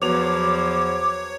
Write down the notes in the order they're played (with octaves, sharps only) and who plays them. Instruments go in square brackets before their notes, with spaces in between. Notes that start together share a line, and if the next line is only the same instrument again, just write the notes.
[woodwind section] E2 F3 [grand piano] F#3 B3 F7 [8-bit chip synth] C#5 [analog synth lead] D6